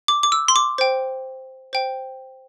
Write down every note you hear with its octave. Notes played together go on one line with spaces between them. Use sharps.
D6
D6
E6
C6
D6
C5 G5
C5 G5